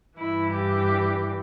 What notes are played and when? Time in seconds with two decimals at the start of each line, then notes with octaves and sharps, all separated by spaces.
0.19 G2 E3 E4
0.54 G4